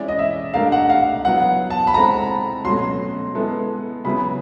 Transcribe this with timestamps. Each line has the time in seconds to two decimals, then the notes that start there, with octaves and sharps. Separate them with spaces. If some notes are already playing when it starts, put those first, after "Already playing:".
Already playing: E3 G#3 C#4 E4 D5
0.08 D#5
0.19 E5
0.54 A3 D4 G4 A#4 F5
0.72 F#5
0.90 F5
1.24 F#3 B3 E4 F#5
1.70 A5
1.87 B5
1.94 G#3 C4 E4 A4 A#5
2.65 B2 F#3 A3 C#4 F#4 C6
3.35 G#3 B3 E4 A4
4.05 C#3 F#3 B3 E4 B5